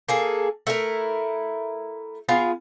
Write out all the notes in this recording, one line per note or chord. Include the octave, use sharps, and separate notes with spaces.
A#3 G#4 A4
A3 E4 A#4
B3 F4 G#4 F5